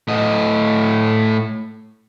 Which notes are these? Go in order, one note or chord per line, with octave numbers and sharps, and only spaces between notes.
A2 D#5